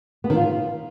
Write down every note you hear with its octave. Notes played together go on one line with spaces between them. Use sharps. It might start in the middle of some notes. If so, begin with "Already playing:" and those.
B3
D#3
F4